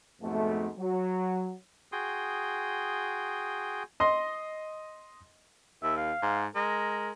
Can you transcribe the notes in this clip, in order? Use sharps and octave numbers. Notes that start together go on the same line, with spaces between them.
F2 G#2 B2 A3
F#3
F#4 G#4 G5 C6 D#6
D#5 C6
D#2 E5
F5
G#2
G#3 A#4